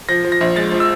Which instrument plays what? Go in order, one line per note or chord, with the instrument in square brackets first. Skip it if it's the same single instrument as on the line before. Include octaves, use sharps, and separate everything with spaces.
[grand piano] F3 A#6
F3
A#6
A#1
G#3 A6
F3
E6